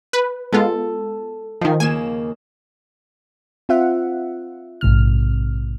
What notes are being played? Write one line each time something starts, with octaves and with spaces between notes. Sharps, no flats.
B4
G#3 B3 F4 A4
D#3 F3 D#5 G#5
D#2 C#3 A#3 G#5 E7
C4 F4 E5 F#5
A#1 G#2 C3 F6